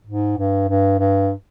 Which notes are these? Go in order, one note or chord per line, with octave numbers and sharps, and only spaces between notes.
G#2
G2
G2
G2